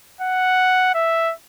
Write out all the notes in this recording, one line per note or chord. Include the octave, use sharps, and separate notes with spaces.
F#5
E5